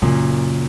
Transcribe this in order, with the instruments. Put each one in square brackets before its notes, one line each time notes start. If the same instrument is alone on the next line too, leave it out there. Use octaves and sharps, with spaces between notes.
[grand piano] F#2 A#2 [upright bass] C#3